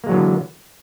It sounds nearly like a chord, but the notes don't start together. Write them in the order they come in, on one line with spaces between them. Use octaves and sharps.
A#3 G#3 F#3 E3 D3